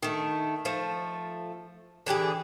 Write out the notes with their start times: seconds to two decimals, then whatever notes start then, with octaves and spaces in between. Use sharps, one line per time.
0.03 D#3 A3
0.65 F3 A3
2.06 D3 E3 G4 G#4